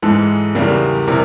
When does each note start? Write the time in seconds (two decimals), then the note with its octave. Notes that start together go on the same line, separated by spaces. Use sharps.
0.02 G#2 E3 G#3 A4
0.55 E2 C#3 E3 G3 A#4
1.07 C3 E3 G3 A#4